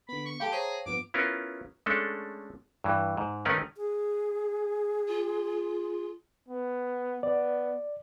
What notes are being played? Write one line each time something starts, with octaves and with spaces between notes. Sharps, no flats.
D3 B3 B5
C#6
A3 G4 F5 G5 A5 B5
G#4 C5 C#5 A#5
G2 F3 B3 D6
B3 C#4 E4 F4 A#4
G#3 A3 C#4 D4 A4
G2 E3
G#2
D#3 A3 C#4 D#4 A#4 B4
G#4
F4
B3
B3 D5